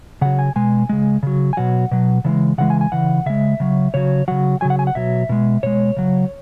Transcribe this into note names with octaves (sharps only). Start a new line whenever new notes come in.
C#3 F#3 F#5
G#5
B2 G#3 G#5
C#3 G#3
C#3 F#3
G#5
B2 F#3 F#5
B2 F#3
C#3 E3 G#3
C#3 E3 G#3 F#5
G#5
G#5
C#3 E3 F#5
C#3 G#3 E5
C#3 F#3
C#3 F#3 C#5
C#3 F#3 F#5
C#3 F#3 G#5
F#5
G#5
F#5
B2 F#3 E5
B2 G#3
B2 G#3 C#5
C#3 F#3